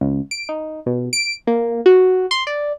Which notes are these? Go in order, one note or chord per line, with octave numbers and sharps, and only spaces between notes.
C#2
D7
D#4
B2
D7
A#3
F#4
C6
D5